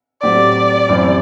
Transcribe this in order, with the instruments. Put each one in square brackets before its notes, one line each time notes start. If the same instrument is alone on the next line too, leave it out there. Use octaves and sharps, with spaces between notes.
[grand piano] A2 F#3 C4 G4 [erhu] D5
[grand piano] F#2 E3 G3 C4